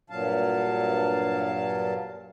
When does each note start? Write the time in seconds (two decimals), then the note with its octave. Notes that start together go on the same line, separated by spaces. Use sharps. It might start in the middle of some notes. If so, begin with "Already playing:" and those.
0.10 G2 A#2 F#3 F5 A5